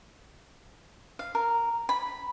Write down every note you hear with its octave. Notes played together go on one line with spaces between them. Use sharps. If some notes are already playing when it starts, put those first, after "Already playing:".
F5
A#4
B5